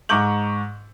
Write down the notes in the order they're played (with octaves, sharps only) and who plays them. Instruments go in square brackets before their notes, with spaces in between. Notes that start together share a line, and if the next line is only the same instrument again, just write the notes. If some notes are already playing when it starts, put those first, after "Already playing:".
[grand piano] G#2 A#5 C#6 D6 G6 F#7